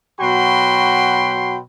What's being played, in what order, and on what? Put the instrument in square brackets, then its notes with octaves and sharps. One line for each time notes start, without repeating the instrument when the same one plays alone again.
[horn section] B2 F#3 F#4 G5 B5 C6